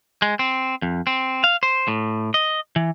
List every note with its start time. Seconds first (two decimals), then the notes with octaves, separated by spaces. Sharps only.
0.22 G#3
0.39 C4
0.82 F2
1.07 C4
1.44 F5
1.63 C5
1.88 A2
2.34 D#5
2.76 E3